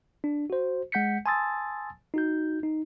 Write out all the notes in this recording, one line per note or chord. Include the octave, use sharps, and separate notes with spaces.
D4
F#4 C5
G#3 F#5 G6 B6 C#7
G#5 A5 C6 D#6 E6 A6
D#4 F#4 G6
D#4